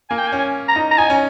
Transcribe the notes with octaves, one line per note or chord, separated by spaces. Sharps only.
A#3 G#5
G5
G#5
C#4
G#5
A#5
D#4
A#5
D#4 G#5
C#4